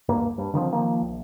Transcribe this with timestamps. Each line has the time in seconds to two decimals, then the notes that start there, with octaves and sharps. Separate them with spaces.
0.08 D1 G2 A#3
0.38 G2
0.54 D3 D#3 F3 C4
0.72 D#3 F3 A#3
1.02 A#1